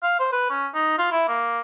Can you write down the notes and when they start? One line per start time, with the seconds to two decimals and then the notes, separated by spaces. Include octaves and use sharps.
0.03 F5
0.19 C5
0.32 B4
0.50 C#4
0.74 D#4
0.98 F4
1.12 E4
1.28 A#3